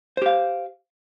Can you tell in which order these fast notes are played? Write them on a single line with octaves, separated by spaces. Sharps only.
C5 G4 F5